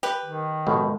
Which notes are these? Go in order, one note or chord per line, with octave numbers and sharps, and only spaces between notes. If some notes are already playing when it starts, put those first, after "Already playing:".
G4 B4
D#3
A1 F2 B2 G#3